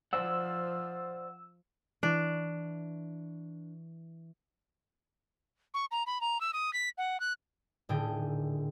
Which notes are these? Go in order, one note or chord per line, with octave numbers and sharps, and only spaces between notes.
F3 C5 D5 F#5 E6
E3 D4 E4 C#6
C#6
A#5
B5
A#5
E6
D#6
B6
F#5
F#6
D#1 A2 D3 G#4 G5